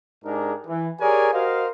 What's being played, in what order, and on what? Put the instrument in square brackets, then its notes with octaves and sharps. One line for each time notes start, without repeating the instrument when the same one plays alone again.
[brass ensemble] G#2 D4 D#4 G4 G#4 A#4
E3
G4 G#4 A#4 C#5 D5 G#5
F#4 A#4 C5 D#5 F5